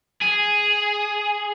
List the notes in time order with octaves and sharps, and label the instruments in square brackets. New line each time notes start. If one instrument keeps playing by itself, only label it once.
[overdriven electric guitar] G#4